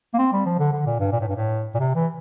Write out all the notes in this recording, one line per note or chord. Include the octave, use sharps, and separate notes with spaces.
A#3
C4
G3
F3
D3
D3
A#2
G2
A#2
A2
G2
A2
A#2
C3
E3